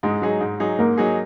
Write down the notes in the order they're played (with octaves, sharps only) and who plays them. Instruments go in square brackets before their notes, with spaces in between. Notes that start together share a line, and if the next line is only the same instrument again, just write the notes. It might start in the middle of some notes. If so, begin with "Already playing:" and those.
[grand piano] G#2 [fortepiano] G#3
[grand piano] F#3 D#4 G#4
G#2
F#3 D#4 G#4
[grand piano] G#2 [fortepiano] A#3
[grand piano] F#3 D#4 G#4